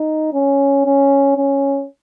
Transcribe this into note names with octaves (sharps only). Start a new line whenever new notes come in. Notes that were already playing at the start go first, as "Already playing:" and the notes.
Already playing: D#4
C#4
C#4
C#4